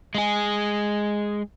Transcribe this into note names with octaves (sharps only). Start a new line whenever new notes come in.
G#3 G#4